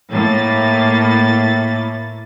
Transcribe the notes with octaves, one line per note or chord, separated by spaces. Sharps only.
A2 A#3 A6